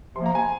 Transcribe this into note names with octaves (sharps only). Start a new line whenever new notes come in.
C3 F3 A#3 C6
A#5
G#5